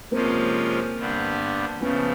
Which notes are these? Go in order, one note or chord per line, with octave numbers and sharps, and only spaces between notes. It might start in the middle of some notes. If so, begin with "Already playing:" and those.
C3 F3 G#3 A#3 C4 C#4 F4
G2 D3 G3 B3 D4
C#3 F3 A3 B3 C#4